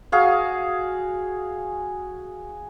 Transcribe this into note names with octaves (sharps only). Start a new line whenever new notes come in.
F#4 G#4 F5